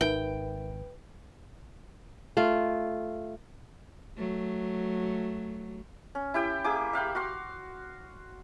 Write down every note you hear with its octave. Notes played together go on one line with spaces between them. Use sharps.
G#1 D#4 A#4 B4 E5 G5
A3 F4
F#3 A3
C#4
E4 G4 G5
A#3 G4 G#4 D6
E5 F5 G5 B5
F#4 F5 C6